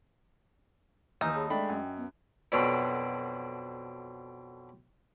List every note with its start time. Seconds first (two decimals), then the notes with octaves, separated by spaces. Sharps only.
1.21 D#2 E3 D#4 G#5 E6 F6 G6
1.35 G#4 C#5 A5 B5
1.50 G#3 A3 D4 G5 B5
1.69 F#2
1.97 B3
2.52 F2 B2 D3 F#3